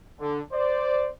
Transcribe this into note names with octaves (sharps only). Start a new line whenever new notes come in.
D3
C5 D5